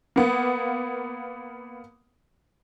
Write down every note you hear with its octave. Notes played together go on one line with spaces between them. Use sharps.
A#3 B3